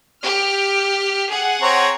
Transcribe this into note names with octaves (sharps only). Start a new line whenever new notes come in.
G4 F6
G#4 F#5
C4 C#5 A#5